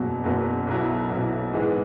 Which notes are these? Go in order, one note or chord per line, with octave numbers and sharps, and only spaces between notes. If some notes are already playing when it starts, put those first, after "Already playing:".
Already playing: F#1 E2 B2 F#3
F#1 E2 B2 F#3
B1 B2 F#3 E4
B1 B2 F#3 E4
G#2 E3 G#3 B3